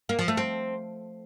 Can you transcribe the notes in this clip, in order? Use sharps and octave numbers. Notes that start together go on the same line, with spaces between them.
A#3
F3
A3
C4